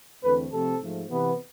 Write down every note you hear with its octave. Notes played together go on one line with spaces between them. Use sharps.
E2 D3 A3 C4 B4
C3 F3 A3 C4 A4
G#2 F3 A3
C3 E3 B3